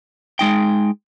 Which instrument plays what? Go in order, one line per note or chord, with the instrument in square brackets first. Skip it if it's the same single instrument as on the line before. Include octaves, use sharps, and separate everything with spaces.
[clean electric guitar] G#3 D#4 G5